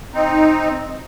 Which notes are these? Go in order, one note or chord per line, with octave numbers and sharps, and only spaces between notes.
C4 D#4